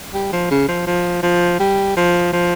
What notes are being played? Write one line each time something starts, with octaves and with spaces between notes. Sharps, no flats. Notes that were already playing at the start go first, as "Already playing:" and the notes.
G3
F3
C#3
F3
F3
F3
G3
F3
F3